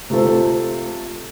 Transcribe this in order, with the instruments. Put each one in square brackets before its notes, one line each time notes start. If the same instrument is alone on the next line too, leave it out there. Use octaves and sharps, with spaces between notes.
[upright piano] C3 A3 F4 A4 C5